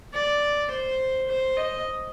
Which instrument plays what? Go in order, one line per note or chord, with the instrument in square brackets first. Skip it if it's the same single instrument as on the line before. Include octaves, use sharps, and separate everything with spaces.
[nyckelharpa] D5
C5
C5
D#5